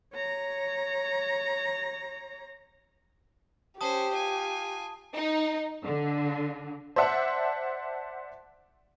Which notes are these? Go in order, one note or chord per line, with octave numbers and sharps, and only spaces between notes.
C#5 A#5
C#4 G4 C5 A5 D#6
F4 G#5
D#4
D3
C5 D5 E5 F#5 A5